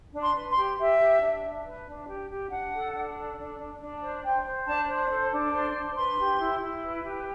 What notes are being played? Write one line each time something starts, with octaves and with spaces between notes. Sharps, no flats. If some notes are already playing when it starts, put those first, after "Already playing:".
D4
C6
B4
C6
G4
G4 E5
G4
D4
D4
B4
D4
G4
G4
D4 F#5
A4
D4
A4
D4
D4
D4
C5
C5 G5
C5
D4 A5
C5
A4
D4
C5
D4
B4 C6
G4
E4
E4
B4
G4